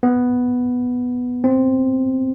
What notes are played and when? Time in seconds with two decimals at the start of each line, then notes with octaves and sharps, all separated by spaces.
0.03 B3
1.44 C4